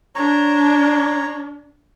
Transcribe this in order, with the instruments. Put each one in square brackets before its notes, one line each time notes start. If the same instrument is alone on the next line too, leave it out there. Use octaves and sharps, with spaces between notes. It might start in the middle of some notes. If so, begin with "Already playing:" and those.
[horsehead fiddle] D4 [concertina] C#5 A#5